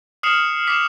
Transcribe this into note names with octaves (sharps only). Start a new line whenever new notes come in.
D#6 F6 C7 C#7 E7 F7
D6 B6 C7 E7